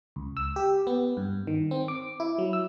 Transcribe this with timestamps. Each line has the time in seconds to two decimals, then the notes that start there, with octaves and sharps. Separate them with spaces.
0.16 C#2
0.37 E6
0.56 G4
0.87 B3
1.17 G2
1.47 D#3
1.71 C4
1.88 D6
2.20 E4
2.38 F#3
2.53 E6